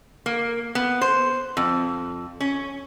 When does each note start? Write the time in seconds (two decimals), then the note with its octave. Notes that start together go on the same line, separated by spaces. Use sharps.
0.26 A#3
0.75 B3
1.01 C5
1.57 F2
2.40 C#4